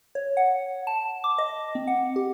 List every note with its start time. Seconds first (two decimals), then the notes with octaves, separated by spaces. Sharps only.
0.15 C#5
0.37 F#5
0.87 A5
1.24 D6
1.38 D#5
1.75 C4
1.87 F#5
2.16 G4